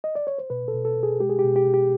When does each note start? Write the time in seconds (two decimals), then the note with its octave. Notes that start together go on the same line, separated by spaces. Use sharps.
0.04 D#5
0.15 D5
0.27 C#5
0.38 C5
0.50 B2 B4
0.68 A4
0.74 B2
0.85 A4
0.97 B2
1.03 G#4
1.20 G#3 G4
1.30 G#4
1.39 G4
1.44 B2
1.56 G4
1.67 B2
1.74 G4